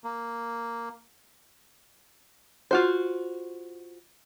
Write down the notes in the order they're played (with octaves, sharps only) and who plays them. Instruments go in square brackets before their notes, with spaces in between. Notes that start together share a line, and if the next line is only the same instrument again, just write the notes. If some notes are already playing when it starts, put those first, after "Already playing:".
[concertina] A#3
[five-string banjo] F4 F#4 C5